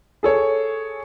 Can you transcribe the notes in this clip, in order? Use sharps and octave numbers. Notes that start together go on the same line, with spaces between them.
G#4 A4 C#5